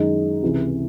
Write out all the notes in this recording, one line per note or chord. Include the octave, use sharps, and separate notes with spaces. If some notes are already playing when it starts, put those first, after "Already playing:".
Already playing: F#2 D#3 G#3 D#4
C#2 C3 E3